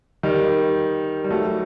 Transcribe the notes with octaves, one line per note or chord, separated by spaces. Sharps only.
D#3 G3
G3
F#3 A3